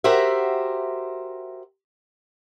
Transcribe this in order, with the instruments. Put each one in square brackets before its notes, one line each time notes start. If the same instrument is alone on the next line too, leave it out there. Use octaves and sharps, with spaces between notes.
[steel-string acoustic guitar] F#4 G4 A#4 C5 E5